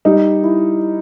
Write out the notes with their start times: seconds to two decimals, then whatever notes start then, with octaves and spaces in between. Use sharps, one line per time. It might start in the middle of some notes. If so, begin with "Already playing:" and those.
0.05 G3 D#4
0.43 E4